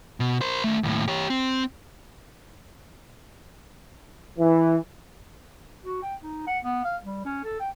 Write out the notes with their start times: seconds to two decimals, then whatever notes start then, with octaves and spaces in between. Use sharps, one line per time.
0.20 B2
0.41 A#4 C5
0.64 D#3 A3
0.83 D#2 A2
1.08 G4 C#5
1.30 C4
4.38 E3
5.84 F#4
6.02 G5
6.23 D#4
6.47 F#5
6.64 B3
6.84 F5
7.04 G3
7.25 C#4
7.44 A4
7.60 G5